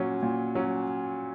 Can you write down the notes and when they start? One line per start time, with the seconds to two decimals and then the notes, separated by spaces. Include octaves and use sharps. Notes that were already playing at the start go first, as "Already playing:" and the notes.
Already playing: A#2 F#3 C#4
0.22 A#2
0.55 F#3 C#4